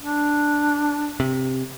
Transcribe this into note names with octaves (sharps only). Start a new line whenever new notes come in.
D4
C3